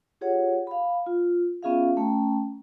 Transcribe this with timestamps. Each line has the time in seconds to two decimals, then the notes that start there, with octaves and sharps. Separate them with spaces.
0.21 F4 G4 G#4 C#5 F#5
0.67 F5 B5
1.07 F4
1.62 B3 C#4 F4 G#4 E5 F5
1.97 A3 C#4 G5 A#5